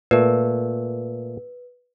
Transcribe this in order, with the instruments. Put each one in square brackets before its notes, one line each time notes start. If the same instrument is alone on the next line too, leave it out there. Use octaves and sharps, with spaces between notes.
[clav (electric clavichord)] A#2 A3 [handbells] B4